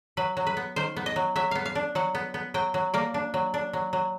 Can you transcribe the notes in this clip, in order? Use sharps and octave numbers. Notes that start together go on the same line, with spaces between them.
F#3 B4
F#3
B4
B3
D#3 C5
B3
D#5
F#3
F#3 E5
B3 F5
F5
D4
F#3 F#5
B3
B3
F#3 G5
F#3
A#3 D5
D4
F#3
D4
F#3
F#3